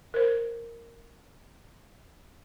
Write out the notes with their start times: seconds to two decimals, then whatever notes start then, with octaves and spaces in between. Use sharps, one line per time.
0.14 A#4 C5